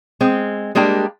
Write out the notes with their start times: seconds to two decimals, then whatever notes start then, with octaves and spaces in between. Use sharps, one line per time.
0.21 G#3 C4
0.75 G3 G#3 A#3 D4 G4